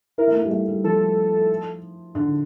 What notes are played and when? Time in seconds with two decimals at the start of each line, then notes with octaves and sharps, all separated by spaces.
0.18 E4 A#4
0.28 A3
0.35 A#3
0.45 G3
0.51 A3
0.68 G3
0.84 F3 A4
2.15 D3